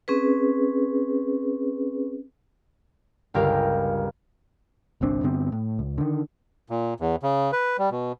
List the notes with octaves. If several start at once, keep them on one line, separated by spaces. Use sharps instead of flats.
C4 C#4 G#4 B4
G1 C#2 G4 A#4 F5
G1 C2 C4 D4
G2 D3 B3 C4
A2
C#2
D3 D#3
A#2
E2
C#3
B4
G3
B2